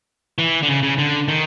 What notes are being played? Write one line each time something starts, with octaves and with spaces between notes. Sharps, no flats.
E3
D3
C#3
C#3
D3
D#3